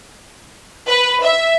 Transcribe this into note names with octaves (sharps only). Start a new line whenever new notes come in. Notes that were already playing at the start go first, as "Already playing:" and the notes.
B4
E5